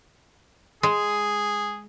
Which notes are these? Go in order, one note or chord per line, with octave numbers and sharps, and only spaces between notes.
G#3 G#4